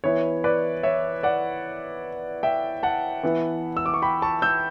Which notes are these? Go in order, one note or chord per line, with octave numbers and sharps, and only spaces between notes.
E3 B3 E4 C#5
B4 D5
C#5 E5
D5 F#5
E5 G5
F#5 A5
E3 B3 E4
E6
D6
C#6
G5 B5
A5 C#6
E6 G6